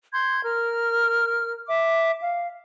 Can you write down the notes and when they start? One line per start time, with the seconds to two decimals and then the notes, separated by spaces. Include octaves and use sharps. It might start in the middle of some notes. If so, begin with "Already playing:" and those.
0.13 C6 G6 G#6
0.43 A#4 F6
1.67 E5 D6
2.20 F5